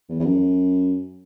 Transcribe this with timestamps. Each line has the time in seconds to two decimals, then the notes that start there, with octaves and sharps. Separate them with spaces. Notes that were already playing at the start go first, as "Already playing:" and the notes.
0.09 E2
0.20 E2
0.25 F#2